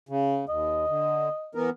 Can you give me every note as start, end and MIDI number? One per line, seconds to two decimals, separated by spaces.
0.09 0.45 49
0.49 0.85 39
0.49 1.52 75
0.89 1.29 50
1.55 1.70 52
1.55 1.70 59
1.55 1.70 70